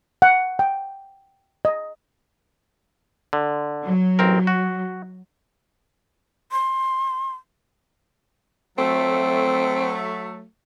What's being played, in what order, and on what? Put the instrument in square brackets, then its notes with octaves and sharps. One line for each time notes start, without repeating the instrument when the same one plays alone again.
[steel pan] F#5
G5
D#5
[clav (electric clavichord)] D3
[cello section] F#3
[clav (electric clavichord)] A1 C4 A#4
F#4
[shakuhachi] C6
[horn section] F#3 A3 [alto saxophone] C4